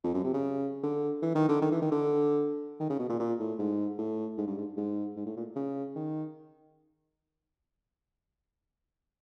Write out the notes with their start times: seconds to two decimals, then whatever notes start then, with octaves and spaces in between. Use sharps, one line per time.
0.04 F2
0.14 F#2
0.24 C3
0.34 C#3
0.83 D3
1.22 E3
1.35 D#3
1.49 D3
1.61 D#3
1.72 E3
1.82 D#3
1.91 D3
2.80 D#3
2.90 C#3
2.99 B2
3.09 A#2
3.20 A#2
3.40 A2
3.59 G#2
3.98 A2
4.38 G#2
4.47 G2
4.58 G#2
4.77 G#2
5.16 G#2
5.26 A2
5.37 A#2
5.56 C#3
5.95 D#3